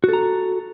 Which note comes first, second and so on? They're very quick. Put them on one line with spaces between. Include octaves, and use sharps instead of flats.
F#4 A4 A#5